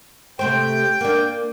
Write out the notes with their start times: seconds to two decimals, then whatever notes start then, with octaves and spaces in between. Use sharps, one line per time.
0.39 C3 A3 C5 G5
1.01 A#3 D4